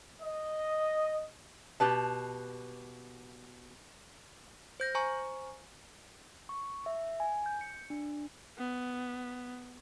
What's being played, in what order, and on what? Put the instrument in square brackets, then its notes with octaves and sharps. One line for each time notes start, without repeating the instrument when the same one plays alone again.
[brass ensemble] D#5
[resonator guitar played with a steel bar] B2 G4 B4 A5
[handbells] C5 G6 A#6
C5 G#5 A#5 C#6
[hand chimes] C#6
E5
G#5
G6
C#7
D4
[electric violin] B3